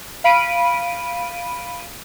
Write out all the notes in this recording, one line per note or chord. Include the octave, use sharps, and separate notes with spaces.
F5 B5 D7 D#7